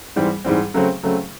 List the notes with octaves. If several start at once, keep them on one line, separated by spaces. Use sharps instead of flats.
G#2 E3 G3 C4
G#2 E3 G3 C4
C#3 F#3 A3 C4
C#3 F#3 A3 C4